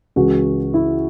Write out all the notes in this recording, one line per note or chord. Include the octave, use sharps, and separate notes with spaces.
C#2 C#3 E3 F#4
E4